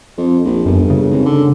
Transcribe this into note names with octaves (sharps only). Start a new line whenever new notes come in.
F2
A#1
G1 F#2
C#3
G#1
D3